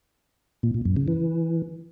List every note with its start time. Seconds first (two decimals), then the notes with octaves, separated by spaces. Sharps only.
0.63 A#2
0.74 A#2
0.85 F#2
0.97 C#3
1.08 E3